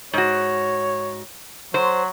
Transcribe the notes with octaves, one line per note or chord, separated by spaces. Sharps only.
G#2 F#4 C#5
F#3 C5